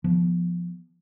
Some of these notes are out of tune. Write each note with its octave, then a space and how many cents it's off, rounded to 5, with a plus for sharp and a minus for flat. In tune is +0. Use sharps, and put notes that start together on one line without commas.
F3 +0 B3 -15